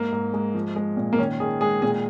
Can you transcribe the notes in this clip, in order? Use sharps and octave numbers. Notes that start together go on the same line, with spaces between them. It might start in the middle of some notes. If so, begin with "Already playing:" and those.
Already playing: G#2 A#3
G#2
G#3
F3
G#3
A#2
A#3
D#3 C#4
D#3 G#4
G#3 G#4
A#2 G#4